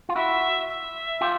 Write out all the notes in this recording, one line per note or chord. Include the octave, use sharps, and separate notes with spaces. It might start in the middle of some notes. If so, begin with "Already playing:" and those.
F4
E4 F#4 E5
E5
F4 G4